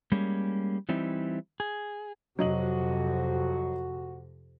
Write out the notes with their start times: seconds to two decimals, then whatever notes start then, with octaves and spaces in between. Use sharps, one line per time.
0.12 G3 G#3 A#3 C#4
0.89 E3 G3 C4 D#4 E4
1.60 G#4
2.39 F2 C3 F#3 F#4 D#5 F#7